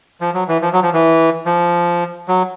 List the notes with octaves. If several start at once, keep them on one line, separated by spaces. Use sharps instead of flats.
F3
F#3
E3
F3
F#3
F3
E3
F3
F#3